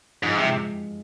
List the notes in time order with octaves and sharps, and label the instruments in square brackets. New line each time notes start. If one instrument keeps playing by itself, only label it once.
[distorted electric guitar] G#2 [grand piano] F3
[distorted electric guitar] C3 [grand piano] G#3